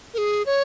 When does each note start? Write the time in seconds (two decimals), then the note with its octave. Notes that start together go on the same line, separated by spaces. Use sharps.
0.14 A#4
0.18 G#4
0.46 C#5